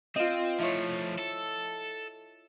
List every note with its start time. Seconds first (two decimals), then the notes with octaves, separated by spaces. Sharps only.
0.16 C4 F4 D#5
0.60 F3 A3 E4 C#5
1.19 A4